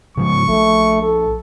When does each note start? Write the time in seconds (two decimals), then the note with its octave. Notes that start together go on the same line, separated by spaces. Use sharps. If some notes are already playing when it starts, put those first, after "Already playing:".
0.17 C#3 F3 G#3 C#6
0.49 A#1 A3
1.02 A4